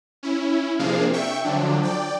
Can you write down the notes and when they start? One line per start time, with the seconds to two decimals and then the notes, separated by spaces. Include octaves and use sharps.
0.23 C#4 E4
0.79 C3 F3 A#3 D4 G#4 F5
1.13 E5 G5 C#6
1.45 D3 F3 F#3 D4
1.83 D5 G5